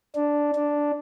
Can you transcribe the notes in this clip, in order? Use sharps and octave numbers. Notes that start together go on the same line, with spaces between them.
D4
D4